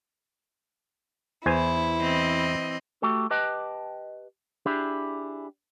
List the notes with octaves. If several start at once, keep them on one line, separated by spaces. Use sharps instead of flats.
E2 E4 C5 G#5
E3 C4 D#5
A3 F#4 G4 A4
G4 B4 D#5 G5 A5
D4 E4 G4 G#4